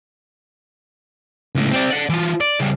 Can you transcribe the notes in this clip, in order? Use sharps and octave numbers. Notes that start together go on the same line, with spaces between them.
C#2 A2
C4 D5
D5 F#5
E3 F4
D5
C#3 G3